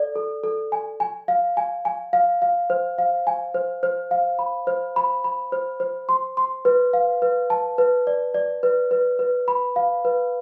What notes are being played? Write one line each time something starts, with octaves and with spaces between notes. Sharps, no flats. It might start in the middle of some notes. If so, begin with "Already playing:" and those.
Already playing: A4 D5
A4
A4
G#5
G#5
F5
G#5
G#5
F5
F5
C5
F5
G#5
C5
C5
F5
B5
C5
B5
B5
C5
C5
C6
C6
B4
F5
B4
A5
B4
D5
D5
B4
B4
B4
B5
F5
B4